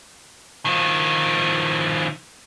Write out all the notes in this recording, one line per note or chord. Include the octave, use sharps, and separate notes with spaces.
D#3 F3